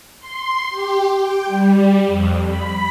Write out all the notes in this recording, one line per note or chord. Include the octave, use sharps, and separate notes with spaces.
C6
G4
G5
G3
F2
B5